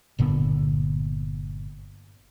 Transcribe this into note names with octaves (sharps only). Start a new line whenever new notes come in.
G1 A#2 D3 B3